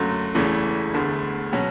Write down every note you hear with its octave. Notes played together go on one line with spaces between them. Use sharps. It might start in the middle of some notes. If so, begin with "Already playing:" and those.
Already playing: F#1 F#2 D3 F#3 A3
E1 E2 C#3 E3 A3
E1 D2 D3 A3
B2 F#3 C#4